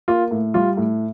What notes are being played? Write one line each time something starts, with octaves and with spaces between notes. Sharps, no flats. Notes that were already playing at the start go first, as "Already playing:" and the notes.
A#3 F4
A2
G3 F4
A2